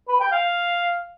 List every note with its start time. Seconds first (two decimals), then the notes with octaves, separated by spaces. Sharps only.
0.09 B4
0.20 G5
0.32 F5